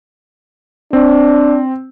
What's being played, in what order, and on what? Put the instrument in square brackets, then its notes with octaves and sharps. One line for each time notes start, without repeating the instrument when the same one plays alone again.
[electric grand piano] C4 [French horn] D4